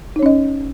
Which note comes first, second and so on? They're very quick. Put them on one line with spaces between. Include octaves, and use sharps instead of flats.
D#4 C#5 C#4 D#5